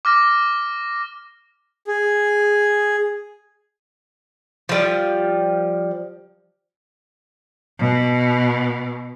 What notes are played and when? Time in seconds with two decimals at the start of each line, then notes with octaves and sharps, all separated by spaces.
0.05 D6 F6 A#6
1.87 G#4
4.69 F3 G3
7.79 B2